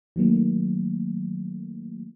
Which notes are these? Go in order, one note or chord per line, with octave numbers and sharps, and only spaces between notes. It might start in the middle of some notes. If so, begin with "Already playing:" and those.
D#3 F#3 A3 A#3